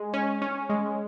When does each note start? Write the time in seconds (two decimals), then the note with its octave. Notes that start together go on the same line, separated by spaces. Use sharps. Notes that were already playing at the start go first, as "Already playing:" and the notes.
Already playing: G#3
0.13 C#4
0.42 C#4
0.70 G#3